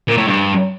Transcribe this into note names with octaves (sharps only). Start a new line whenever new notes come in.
A#2
A2
G2